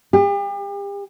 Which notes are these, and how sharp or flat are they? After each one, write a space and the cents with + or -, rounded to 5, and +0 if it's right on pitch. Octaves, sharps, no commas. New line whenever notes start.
G4 +40